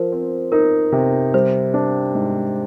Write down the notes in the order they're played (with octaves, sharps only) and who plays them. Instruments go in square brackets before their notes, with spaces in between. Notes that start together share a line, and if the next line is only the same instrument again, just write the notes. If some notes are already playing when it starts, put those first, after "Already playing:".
Already playing: [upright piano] F3 [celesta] A#4 C5
[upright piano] C4
[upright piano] D#4 [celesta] A#4
[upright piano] C3
[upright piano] G3 [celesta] C5
[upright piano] D4
G#2